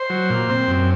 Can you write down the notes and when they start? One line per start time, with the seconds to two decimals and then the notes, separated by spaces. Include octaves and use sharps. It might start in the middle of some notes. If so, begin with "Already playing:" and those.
Already playing: C5
0.10 F#3
0.30 A#2
0.49 C4
0.68 F#2